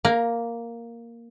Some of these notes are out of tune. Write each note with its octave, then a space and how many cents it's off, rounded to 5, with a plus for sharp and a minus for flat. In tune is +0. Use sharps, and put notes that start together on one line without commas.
A#3 +0 A#5 +25